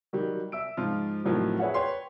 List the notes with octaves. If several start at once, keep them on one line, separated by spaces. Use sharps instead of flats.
D#3 F#3 G3
E5 E6 D7
G#2 F3 F4
A2 D#3 F3 F#3 C4 G4
G#4 B4 C#5 E5 F#5
B4 C#5 G5 C6